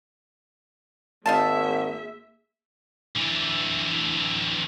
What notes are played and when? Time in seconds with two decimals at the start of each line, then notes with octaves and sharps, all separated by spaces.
1.26 G#1 G#3 A#3 D#4 E5 F5 A5
3.16 D3 E3